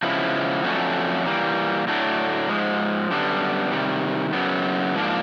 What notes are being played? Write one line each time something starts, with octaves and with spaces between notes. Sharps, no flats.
C#3 F3 G#3 B3 E4
F2 D3 F#3 A3 C#4
E3 G3 A#3
A2 F#3 A3 D4
G#2 F3 G#3
F#2 D3 G3 B3 D4
C3 D#3 G3
F#2 C#3 F#3 B3
G#2 F3 A#3 D4